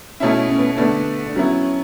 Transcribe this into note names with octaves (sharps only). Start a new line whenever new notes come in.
B2 A3 C#4 E4
C#4
B3
D3 A3 B3 D4
D4
F#3 B3 C#4 E4